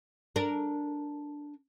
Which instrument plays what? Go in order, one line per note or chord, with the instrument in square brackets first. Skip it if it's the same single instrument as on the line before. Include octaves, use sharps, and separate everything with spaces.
[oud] D4 A#4